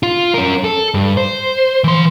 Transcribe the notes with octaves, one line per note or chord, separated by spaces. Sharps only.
F4
C#4 A#4
A4
G2
C5
E3 C6